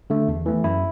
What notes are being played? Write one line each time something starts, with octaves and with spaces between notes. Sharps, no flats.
D3 A3
E2
E3 A3
F#2 E4